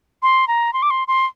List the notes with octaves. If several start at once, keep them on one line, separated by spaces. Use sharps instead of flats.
C6
A#5
C6
D6
C6
C6